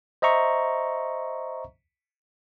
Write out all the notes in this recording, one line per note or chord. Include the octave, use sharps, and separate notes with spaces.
C5 D#5 E5 A#5 C#6